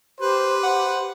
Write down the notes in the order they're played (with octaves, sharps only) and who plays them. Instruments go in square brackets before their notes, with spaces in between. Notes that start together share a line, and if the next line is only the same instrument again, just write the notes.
[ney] G4 [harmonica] B4 [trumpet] C5
[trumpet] C5 [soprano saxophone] F#5